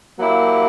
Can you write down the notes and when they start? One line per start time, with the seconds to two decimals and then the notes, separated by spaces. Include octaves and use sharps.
0.18 F#3 A#3 E4 G4